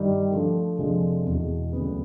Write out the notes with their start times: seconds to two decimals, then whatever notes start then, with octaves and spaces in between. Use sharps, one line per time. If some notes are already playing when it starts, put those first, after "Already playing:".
Already playing: G2 D#3 G3
0.32 D3 F3 A3
0.78 F1 F2 D3 F3 G#3
1.26 E2 B2 G#3
1.73 D2 C#3 F#3 B3